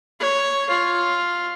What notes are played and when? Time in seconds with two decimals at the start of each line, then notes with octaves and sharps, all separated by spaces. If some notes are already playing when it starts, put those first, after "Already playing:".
0.20 C#5
0.69 F4